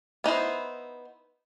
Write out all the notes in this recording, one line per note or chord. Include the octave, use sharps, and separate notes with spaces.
B3 D#4 E4 C5